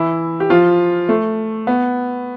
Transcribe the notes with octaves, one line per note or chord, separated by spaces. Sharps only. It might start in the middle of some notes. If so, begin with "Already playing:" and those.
Already playing: E3 E4
G4
F3 F4
A3
B3